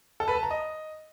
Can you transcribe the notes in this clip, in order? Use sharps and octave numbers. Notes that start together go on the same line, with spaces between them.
A4
B4
A5
A#5
D#5